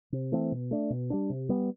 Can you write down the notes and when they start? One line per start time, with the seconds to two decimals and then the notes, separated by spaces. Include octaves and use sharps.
0.12 C3
0.32 E3 A3 C4
0.52 B2
0.71 A3 D4
0.90 B2
1.10 G3 B3 D4
1.30 C3
1.49 G3 B3